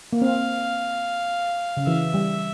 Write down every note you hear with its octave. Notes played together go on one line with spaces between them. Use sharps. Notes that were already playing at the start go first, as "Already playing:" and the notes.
A#3
C4 F5
C#3
E3 E5
G3